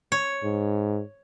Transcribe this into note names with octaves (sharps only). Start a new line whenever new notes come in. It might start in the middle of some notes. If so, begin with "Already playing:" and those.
C#5
G#2